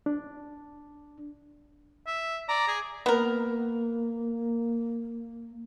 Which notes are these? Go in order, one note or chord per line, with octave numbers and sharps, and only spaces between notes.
D4
E5
D5 A#5
G#4
A#3 B3 A#4